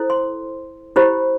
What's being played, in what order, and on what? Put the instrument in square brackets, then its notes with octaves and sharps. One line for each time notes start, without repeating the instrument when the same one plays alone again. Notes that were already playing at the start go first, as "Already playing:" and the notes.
Already playing: [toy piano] E4 A4 C5
C6
E4 G4 C5 B5